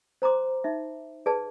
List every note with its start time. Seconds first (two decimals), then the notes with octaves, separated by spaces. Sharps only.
0.22 C5 A#5 C6 D6
0.64 D#4 E5
1.26 G#4 B4 D5 A5